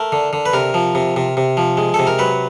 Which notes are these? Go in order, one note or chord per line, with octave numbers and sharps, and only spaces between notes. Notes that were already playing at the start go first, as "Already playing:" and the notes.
Already playing: A3 A#4
D3
D3
B4
C3 A#4
F3
C3
C3
C3
F3
G#3
C3 A4
A#4
F#3 B4